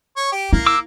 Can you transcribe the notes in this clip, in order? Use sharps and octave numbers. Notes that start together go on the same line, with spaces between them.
C#5
G4
A#3 E4
D6 E6